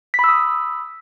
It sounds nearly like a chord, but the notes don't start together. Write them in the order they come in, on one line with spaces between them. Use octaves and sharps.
B6 B5 E6 D#6